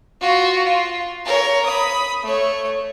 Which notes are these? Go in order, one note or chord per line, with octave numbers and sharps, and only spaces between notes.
F4 F#4
F4
A#4 C#5
B5 D#6
A3 C#5